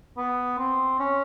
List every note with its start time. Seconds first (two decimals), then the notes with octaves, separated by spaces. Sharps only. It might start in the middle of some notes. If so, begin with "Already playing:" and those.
0.18 B3
0.58 C4
0.99 C#4